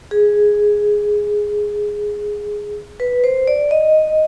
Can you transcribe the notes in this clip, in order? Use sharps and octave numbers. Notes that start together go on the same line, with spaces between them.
G#4
B4
C5
D5
D#5